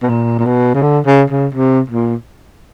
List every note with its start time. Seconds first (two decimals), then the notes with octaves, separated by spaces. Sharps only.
0.02 B2
0.09 A#2
0.39 A#2
0.46 B2
0.75 C#3
0.82 D3
1.06 C#3
1.30 C#3
1.55 C3
1.90 A#2